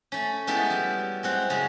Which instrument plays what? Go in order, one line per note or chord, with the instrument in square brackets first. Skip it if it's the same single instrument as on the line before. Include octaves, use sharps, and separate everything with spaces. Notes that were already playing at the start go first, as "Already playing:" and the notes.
[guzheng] A3 C#4
G#3 B3 C#4 E4 G4 A4
F#3 G3
G#3 C4 F#5
F#2 C#3 G#3